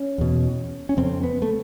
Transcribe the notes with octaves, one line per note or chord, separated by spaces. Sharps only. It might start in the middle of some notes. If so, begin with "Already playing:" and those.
Already playing: C#4
E2 B2
C#4
F2 C#3 C4
B3
A3